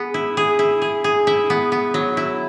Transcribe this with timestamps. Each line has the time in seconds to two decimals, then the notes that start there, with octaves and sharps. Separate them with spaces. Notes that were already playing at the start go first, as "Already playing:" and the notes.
Already playing: B3 G#4
0.14 E4
0.37 G#4
0.59 E4
0.82 G#4
1.04 G#4
1.27 E4
1.50 B3
1.72 B3
1.94 F#3
2.17 E4